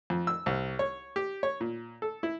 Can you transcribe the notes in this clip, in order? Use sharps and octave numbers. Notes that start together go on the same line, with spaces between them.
F2
E6
C2
C#5
G4
C#5
A#2
A4
E4